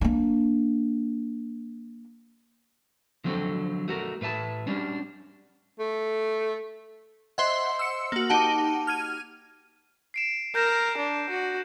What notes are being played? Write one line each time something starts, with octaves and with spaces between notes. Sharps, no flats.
A#3 D4
D3 F3 F#3 C4 F#4 A4
A3 F#4 A#4
A2 B4 E5 A5
G3 C#4 D4
A3
C5 D#5 E5 F#5 C6 C7
E6 C#7
A#3 F#4
D#4 G4 F#5 A5 D6
F6 G#6 D#7
C7 D7 E7
A#4 G6 A#6 E7
D4
F#4